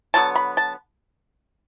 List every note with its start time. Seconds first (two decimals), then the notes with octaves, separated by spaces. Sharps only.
0.14 D3 F#3 B3 A5
0.36 B5
0.57 A5